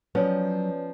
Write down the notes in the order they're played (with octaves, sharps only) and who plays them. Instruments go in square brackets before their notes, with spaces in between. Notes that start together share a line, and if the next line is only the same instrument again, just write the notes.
[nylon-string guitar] F3 B3 C#4 [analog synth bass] F#3 [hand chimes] B4 C#5 D5